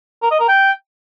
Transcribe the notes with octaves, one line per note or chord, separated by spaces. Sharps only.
A#4
D#5
A#4
G5